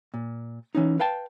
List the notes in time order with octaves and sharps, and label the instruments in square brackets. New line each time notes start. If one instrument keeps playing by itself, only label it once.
[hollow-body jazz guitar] A#2
E3 C#4 D#4
B4 F5 G5 A5